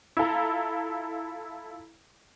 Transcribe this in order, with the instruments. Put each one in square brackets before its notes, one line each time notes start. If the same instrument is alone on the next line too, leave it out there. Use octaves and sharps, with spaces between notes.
[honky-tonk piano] E4 F4 A4 A#5